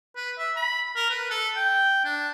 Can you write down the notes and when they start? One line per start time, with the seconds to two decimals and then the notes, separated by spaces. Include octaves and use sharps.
0.16 B4
0.39 E5
0.56 B5
0.96 A#4
1.10 B4
1.31 A4
1.56 G5
2.05 D4